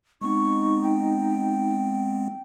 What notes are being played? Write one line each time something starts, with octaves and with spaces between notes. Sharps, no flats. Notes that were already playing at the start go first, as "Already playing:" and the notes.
G#3 B3 C4 D#4 C#6
G5